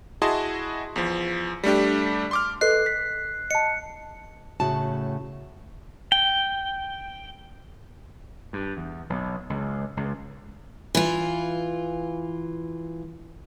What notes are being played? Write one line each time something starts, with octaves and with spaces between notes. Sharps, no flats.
E4 F#4 G#4 D#5 A5 C6
E2 F3
G3 A3 D4 G4
C6 D6 F6
A4 B4 D#5 F#6 C7
B6
D#5 A5 C#7
A2 C#3 F#4 A5
G5
G2
E2
B1
C#2
C#2
E3 F4